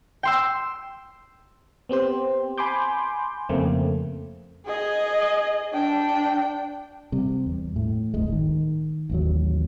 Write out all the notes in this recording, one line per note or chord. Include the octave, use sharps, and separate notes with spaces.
G5 C6 E6
B3 C4 G4 C5
G#5 B5 C6 D6 G6
F2 C#3 A3 A#3 C4
G#4 D#5
D4 G5
C3 G3
E2
A2
D1 G1 G#3
D#3
A1 D#2 F#3